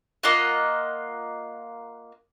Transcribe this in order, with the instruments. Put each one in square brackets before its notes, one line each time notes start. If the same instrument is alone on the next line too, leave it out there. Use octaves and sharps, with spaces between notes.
[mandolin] A#3 F4 D#5 F#5